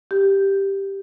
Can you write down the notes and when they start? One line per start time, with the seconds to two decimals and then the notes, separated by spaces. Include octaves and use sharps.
0.11 G4